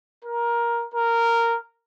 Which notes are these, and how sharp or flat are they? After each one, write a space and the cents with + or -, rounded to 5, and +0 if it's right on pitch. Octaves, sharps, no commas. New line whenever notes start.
A#4 +15
A#4 -10